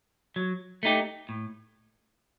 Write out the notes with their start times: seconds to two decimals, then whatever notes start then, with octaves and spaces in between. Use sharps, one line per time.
0.36 F#3
0.83 A3 D#4 G4
1.29 A2